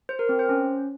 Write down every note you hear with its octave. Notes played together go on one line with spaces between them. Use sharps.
C5
A#4
C4
C5
C#4